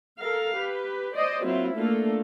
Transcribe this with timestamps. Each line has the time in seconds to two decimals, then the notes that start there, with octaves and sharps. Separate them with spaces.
0.18 A4 A#4 F5
0.54 G4 B4
1.14 C5 D5 D#5
1.44 F#3 A#3 C4 E4 F4
1.75 A3 A#3 D4 F4 A4